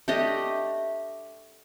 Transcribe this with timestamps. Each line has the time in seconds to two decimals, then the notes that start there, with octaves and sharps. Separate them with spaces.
0.08 A3 D4 G4 D#5